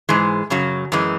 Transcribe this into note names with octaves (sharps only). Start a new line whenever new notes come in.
G#2 E3 G#3
F#2 C#3 F#3
F#2 E3 G#3